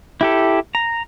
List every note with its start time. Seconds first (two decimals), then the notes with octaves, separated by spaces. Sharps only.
0.21 E4 G4 A4
0.75 A#5